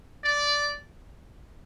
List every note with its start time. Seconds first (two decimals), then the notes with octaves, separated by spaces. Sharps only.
0.24 D5